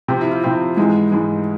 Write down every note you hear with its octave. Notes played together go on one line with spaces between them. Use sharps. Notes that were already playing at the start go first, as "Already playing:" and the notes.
C3 F3 C4 G4
E4
F4
C3 F3 C4 E4
G#2 E3 G#3
G#2 E3 G#3